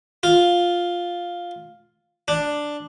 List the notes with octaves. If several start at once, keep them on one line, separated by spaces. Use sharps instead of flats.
F4
D4